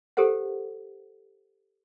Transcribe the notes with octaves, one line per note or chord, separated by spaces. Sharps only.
G4 A4 A#4 C5 F#5